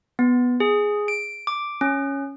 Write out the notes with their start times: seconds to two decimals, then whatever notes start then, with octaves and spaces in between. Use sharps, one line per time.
0.19 B3
0.60 G#4
1.08 D7
1.47 D6
1.81 C#4